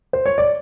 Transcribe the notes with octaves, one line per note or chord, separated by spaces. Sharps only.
C5
C#5
D5